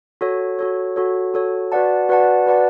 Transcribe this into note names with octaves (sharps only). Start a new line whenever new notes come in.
F#4 A4 C#5
F#4 A4 C#5
F#4 A4 C#5
F#4 A4 C#5
F#4 B4 D5 F#5 A5
F#4 B4 D5 F#5 A5
F#4 B4 D5 F#5 A5